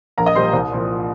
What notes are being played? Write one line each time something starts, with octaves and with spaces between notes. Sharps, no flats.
A#1 A#4 A#5
D#5 D#6
A#2 G3 C5 C6
C2
A#2 F3